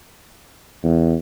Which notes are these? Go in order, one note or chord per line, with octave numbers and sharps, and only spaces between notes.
E2